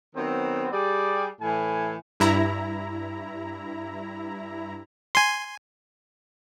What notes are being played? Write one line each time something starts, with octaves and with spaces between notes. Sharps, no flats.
D#3 F#3 B3 C4
G3 G#4 D5
A2 E3 G#5
G2 E4 A#5
G#5 C6